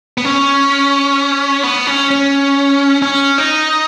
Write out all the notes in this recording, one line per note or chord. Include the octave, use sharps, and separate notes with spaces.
B3
C#4
B3
C#4
C#4
C#4
D#4